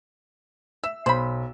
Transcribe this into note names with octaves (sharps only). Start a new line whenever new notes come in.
E5 E6
B1 C5 B5